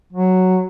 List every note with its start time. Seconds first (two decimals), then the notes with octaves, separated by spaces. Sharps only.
0.13 F#3